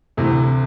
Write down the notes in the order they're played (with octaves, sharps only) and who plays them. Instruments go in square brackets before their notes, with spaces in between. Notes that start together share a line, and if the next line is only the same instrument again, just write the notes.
[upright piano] D2 C3 E3